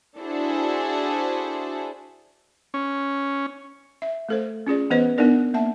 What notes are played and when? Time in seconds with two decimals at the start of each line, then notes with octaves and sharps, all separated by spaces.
0.18 D4 E4 F#4 G#4 A4 C5
2.74 C#4
4.02 E5
4.29 A3 A4 C5
4.67 C#4 F4 G#4 D5
4.90 E3 B3 B4 C5 D#5
5.18 B3 D4 D#4 A#4 D5
5.54 A#3 E5 A5